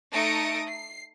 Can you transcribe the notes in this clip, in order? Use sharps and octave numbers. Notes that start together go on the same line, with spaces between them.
A3 D#4 D#6 A#6 C#7 D7
C7